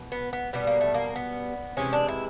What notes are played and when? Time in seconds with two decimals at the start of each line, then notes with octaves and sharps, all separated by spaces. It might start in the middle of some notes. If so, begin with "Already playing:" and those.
Already playing: B2
0.12 B3
0.33 B3
0.53 B2 G3 B3
0.67 A#3
0.81 A3
0.94 A#3
1.16 B3
1.77 C3 E3 G#3 C#4
1.93 D4
2.08 E4